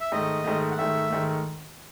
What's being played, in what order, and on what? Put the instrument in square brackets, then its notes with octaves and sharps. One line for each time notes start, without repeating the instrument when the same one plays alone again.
[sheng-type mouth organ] E5
[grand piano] G#2 D#3 A3 [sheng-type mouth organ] D#5
[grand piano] G#2 D#3 A3
[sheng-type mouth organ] F#5
[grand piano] G#2 D#3 A3 [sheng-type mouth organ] E5
[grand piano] G#2 D#3 A3